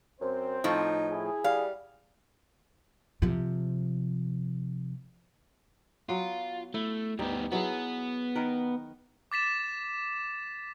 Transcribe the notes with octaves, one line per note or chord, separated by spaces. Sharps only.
F#2 C4 C5
A2 F3 D#4
E4 G#4
G3 F5
C3 F3
F#3 B3 F4
A3 E4
D2 G3 B3 D#4
F#3 B3 E4 G#4
D#3 A#4 B4
D6 A6 B6 E7